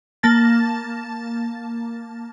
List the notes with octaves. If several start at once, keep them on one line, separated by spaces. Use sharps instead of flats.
A#3 A5 A6